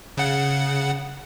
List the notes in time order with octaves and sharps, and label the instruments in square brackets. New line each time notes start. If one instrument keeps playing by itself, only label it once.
[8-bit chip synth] C#3 F#5